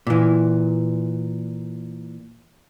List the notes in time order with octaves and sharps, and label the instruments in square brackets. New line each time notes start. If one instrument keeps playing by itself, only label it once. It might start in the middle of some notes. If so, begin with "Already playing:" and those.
[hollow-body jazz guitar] A#2 E3